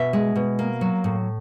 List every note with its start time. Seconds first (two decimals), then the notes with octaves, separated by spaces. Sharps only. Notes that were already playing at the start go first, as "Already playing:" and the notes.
Already playing: B2 E5
0.13 G#3
0.36 B2
0.59 A#3
0.81 F#3
1.04 A2